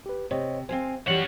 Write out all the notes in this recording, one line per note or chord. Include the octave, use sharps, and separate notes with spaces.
G4 B4
C3 C5 C#5 D#5
C4 C5 F5 G#5
E3 G3 C#4 G4 C#5 F#5